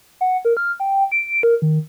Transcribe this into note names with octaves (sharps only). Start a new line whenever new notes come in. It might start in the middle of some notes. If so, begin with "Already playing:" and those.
F#5
A#4
F6
G5
D7
A#4
D#3